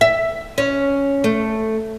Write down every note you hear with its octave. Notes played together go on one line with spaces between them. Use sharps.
E5
C#4
A3